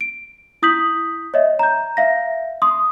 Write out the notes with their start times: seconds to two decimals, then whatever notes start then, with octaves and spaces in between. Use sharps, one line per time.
0.01 D7
0.62 E4 D#6 G6 B6 F#7
1.34 C#5 D#5 E5
1.59 A#5 G6
1.97 E5 F5 A#6
2.62 C6 D#6